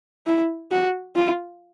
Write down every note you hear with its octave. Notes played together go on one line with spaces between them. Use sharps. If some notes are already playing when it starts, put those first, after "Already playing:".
E4
F#4
F4